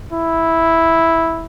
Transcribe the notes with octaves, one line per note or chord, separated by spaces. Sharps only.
E4